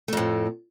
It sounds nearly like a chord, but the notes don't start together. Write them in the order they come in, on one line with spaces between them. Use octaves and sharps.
A3 F2 A2